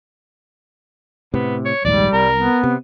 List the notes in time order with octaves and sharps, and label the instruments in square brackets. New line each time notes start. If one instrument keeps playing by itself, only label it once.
[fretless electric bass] A2 C3 [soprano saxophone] B3
[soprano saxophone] C#5
[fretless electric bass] A#1 D#2 G#2 [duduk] G3 [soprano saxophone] D5
[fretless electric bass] C2 [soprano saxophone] A#4
[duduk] B3
[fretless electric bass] C3